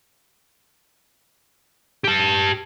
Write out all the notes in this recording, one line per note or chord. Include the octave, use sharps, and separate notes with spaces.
G4 A5